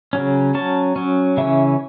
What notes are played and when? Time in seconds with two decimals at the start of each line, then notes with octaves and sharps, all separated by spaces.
0.13 C#3 F#3 C#4
0.55 F#3 C#4 A5
0.96 F#3 C#4
1.37 C#3 E3 C#4 E5